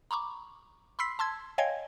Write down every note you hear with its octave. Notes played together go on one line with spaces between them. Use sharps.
A#5 B5 C#6 D6
B5 C6 E6 B6 C7
A5 C6 E6 G#6
C#5 D#5 F5 G5 G#5 G#6